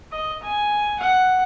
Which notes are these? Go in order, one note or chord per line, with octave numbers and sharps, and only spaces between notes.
D#5
G#5
F#5